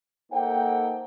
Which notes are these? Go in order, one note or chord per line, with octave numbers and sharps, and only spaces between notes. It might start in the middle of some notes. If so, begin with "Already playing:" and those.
A#3 D#4 A4 C5 F#5 G5